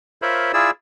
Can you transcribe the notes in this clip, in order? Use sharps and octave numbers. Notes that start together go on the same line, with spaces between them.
F4 A#4 C5 C#5 E5 B5
E4 F4 G#4 D5 E6